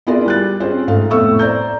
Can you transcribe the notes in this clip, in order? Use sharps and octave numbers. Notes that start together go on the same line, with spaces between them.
B3 E4 F4 G#4 A#4 D5
G3 F#6 A6
C4 C#4 F4 G#4 C5
G#2 A3 F5
F1 A2 A3 B3 C#6 E6
C5 D5 A#5 G6